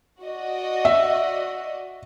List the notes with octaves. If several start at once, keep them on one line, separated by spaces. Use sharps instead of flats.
F#4 D5 D#5
E5